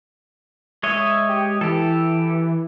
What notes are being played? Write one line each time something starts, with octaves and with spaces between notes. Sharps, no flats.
G#3 C#5 D#5 E5
G4
E3 G4 A4